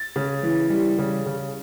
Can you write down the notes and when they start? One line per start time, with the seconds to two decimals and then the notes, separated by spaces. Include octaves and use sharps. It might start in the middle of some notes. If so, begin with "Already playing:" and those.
Already playing: A6
0.16 C#3
0.43 E3
0.70 G3
0.99 C#3
1.26 C#3